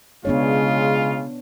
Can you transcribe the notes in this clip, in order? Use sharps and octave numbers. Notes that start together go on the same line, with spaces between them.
C#3 G#3 B3 D4 F4 C#5